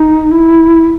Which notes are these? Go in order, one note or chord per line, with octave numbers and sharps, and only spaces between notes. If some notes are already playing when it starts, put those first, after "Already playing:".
Already playing: D#4
E4